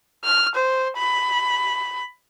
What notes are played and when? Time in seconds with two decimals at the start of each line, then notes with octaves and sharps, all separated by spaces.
0.24 F6
0.55 C5
0.97 B5